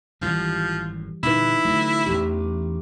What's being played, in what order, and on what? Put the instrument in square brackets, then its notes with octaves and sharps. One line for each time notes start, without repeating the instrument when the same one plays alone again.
[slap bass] G#1 F#2 A2 [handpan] E3 G3 [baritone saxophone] F3
[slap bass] A#2 D3 G3 [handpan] D#4 B4 [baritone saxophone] E4
[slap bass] D3 F#3 [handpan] A3
[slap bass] A1 E2 [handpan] G4